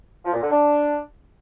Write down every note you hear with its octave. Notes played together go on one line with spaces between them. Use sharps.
F3
A#2
D3
D4